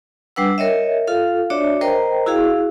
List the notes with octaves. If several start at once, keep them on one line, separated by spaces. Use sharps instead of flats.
G3 D4 B4 F#5 E6
A#4 C#5 D#5 E5
F4 A4 F5
D4 F#4 C#5 D5 E5
A#4 C5 D#5 G5 A#5
E4 F#4 G#4 F5